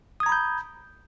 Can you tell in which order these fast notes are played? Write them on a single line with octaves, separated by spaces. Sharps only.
D#6 G#6 A#5 B5 G6